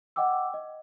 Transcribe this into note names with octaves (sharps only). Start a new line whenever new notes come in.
D#5 F#5 G5 D6 E6
D#5